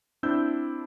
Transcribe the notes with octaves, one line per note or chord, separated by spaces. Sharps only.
C4 D4 E4 E6 G6